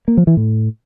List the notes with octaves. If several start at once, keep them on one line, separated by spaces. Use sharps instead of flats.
A#3
F3
E3
A2